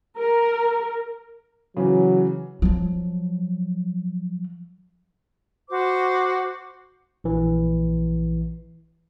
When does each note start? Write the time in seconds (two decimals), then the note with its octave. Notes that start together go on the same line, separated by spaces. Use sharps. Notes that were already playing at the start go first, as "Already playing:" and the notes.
0.18 A#4
1.77 C#3 E3 F#3
2.62 F3 F#3
5.69 F#4 C5 D6
7.24 A#1 E3